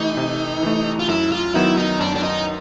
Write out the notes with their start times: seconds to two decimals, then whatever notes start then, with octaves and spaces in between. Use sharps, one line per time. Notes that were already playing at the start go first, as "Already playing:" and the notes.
Already playing: C3 E3 A3 D#4
0.17 C3
0.63 E3 A3
0.99 F4
1.08 F#2 E4
1.32 F4
1.54 D#3 F#3 B3 D#4 E4
1.77 D#4
2.00 F#2 D4
2.16 D4
2.23 D#4